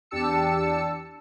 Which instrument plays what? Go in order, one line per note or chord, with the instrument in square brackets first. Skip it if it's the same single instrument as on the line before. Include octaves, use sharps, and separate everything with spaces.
[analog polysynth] E2 D4 G4 A5 E6 C#7